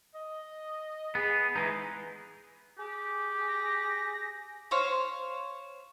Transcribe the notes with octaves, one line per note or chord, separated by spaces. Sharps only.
D#5
B3 G#4
E3 G#3 D#4 B4
G4 G#4
A#6
C5 C#5 F5